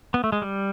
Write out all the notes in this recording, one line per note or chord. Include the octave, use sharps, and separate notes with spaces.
B3
A3
G#3
G3